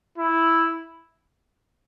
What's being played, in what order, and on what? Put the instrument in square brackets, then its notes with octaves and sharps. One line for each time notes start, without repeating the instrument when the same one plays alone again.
[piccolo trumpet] E4